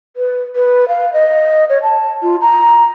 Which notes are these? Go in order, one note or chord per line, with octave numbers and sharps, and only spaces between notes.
B4
B4
F5
D#5
C#5
A5
F4
A#5